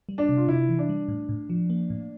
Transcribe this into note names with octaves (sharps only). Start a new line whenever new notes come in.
G3
D4
C3
F4
C3 E4
E3
D4
G3
A2
A2
F3
A#3
A2